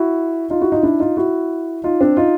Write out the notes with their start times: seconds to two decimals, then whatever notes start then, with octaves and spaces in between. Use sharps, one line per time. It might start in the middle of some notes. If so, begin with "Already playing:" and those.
Already playing: E4 F#4
0.50 D#4 F4
0.61 E4 F#4
0.72 D#4 F4
0.83 D4 E4
1.00 D#4 F4
1.17 E4 F#4
1.84 D#4 F4
2.01 C4 D4
2.17 D#4 F4